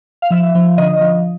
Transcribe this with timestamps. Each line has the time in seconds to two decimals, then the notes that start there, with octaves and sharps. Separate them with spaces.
0.22 F5
0.31 F3 E5
0.55 F3
0.78 D3 D#5
1.01 F3